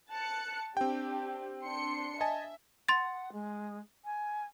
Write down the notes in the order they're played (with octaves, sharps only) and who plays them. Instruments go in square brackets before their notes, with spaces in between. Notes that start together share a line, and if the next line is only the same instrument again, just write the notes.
[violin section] A5 F#6 C#7
[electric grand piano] C4 G5 [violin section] D4 G4
[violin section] D4 C6 C#7
[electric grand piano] D#5 G#5 A5 [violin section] E5
[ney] F#5 [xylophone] C6 A6
[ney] G#3
G#5